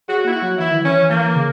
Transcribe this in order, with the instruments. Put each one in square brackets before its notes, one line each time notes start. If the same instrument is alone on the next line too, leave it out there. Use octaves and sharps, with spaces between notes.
[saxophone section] F#4 [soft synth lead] G#4
[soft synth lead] A#3 [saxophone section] E4
[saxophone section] F#4
[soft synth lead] F#3
[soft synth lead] E3 [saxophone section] E4
[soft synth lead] D#3
[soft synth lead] E3 [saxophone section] C#4
[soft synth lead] E3 [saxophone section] A#3
[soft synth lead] C#3